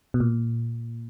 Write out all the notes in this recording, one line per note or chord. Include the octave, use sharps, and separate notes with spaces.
B2
A#2